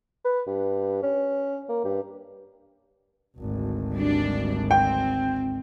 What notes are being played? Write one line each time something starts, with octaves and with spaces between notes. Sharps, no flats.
B4
G2
C#4
A#3
G2
G#1 D2
G3 D4
C4 G5